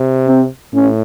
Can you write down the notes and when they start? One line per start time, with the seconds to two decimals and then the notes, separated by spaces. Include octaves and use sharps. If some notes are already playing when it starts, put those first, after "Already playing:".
Already playing: C3
0.28 C4
0.74 A2 C#4